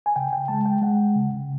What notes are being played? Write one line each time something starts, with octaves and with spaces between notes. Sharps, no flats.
G#5
C#3 G5
G5
G#3 A5
G5
G#3 F#5
C#3